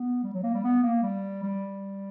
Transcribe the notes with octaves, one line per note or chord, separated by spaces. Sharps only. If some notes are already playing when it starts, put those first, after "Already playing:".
Already playing: B3
G3
F#3
A#3
G3
B3
A#3
G3
G3